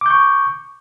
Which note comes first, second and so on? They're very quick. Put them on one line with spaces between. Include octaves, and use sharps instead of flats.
D6 G6 C#6